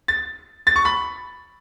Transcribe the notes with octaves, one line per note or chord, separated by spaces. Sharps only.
A6
A6
C#6
B5